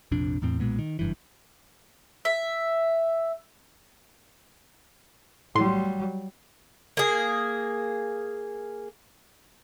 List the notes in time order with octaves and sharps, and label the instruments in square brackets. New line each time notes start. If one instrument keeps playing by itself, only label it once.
[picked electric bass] A#1 F2 C3 D4
E2 A2 C4
B1 A#2 G#3 B3
D#3
F#1 G2 E3
[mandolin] E5
[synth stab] A2 C6 [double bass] F#3 G3
[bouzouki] A#3 G#4